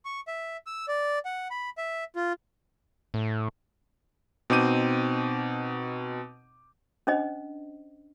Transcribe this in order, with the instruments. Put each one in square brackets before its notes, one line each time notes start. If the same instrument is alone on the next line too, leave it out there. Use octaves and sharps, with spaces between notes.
[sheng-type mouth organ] C#6
E5
E6
D5
F#5
B5
E5
F4
[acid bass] A2
[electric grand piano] B2 C4 D#4 D6 G6 D#7
[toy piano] C#4 D4 C5 D#5